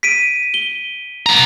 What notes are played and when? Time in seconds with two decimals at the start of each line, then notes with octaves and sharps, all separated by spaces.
0.03 B6 D7 D#7
0.54 G7
1.26 B3 A#5